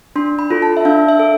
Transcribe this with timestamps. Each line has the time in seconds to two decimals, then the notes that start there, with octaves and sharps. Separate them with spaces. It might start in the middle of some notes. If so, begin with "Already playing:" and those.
0.16 D4 C6
0.39 B5
0.50 F4 A4
0.62 A5
0.77 E5
0.85 D4 F5
1.08 E5
1.20 A4